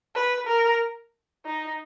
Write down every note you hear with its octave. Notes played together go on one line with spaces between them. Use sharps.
B4
A#4
D#4